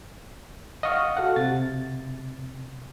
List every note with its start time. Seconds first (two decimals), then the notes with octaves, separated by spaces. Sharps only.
0.83 D#5 F5 F#5 C#6 F6
1.17 F#4 A4 F5 F#5
1.36 C3 A6